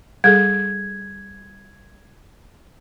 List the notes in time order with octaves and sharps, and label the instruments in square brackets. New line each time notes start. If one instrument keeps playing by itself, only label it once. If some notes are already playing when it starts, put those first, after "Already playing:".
[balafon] G3 G#4 A4 [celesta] G#6